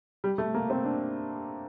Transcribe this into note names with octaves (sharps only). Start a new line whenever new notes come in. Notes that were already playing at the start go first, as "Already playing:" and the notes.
G3
A3
A#3
C4
D4